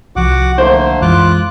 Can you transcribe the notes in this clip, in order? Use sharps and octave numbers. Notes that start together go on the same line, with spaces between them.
C2 F3 F#4 F#5 D6
D3 A3 A#3 C5
F#2 E3 G#3 F4 D6 F#6